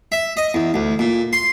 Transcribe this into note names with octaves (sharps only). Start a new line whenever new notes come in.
E5
D#5
E2
D2
A#2
C6